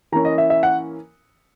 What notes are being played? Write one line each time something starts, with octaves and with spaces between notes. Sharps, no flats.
E3 A#3 C#4 A#5
D#5
E5
E5
F#5